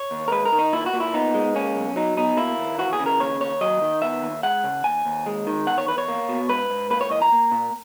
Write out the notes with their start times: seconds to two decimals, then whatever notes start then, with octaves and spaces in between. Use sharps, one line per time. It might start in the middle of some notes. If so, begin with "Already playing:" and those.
Already playing: C#5
0.11 D#2
0.28 A#4
0.32 G#3 B4
0.45 A#4
0.52 D#3
0.59 D#4
0.73 A#2 E4
0.86 F#4
0.94 A#2
1.00 E4
1.14 B3 D#4
1.34 G#3
1.55 A#3 C#4
1.76 B1
1.96 F#3 D#4
2.17 B2 D#4
2.37 A#3 E4
2.58 D#2
2.78 E3 F#4
2.93 G#4
2.99 C#3
3.06 A#4
3.20 D#2 C#5
3.41 D#2 C#5
3.61 F#3 D#5
3.82 D#3
4.02 B3 E5
4.22 D#2
4.43 G#3 F#5
4.64 C#3
4.84 D#2 G#5
5.05 D#2
5.26 G#3
5.47 D#3
5.66 E2 F#5
5.78 C#5
5.88 E2 B4
5.98 C#5
6.08 A#3
6.29 B2
6.49 G#2 B4
6.70 G#2
6.90 A#3 B4
7.01 C#5
7.11 E3 D#5
7.22 A#5
7.32 A#3
7.52 A#2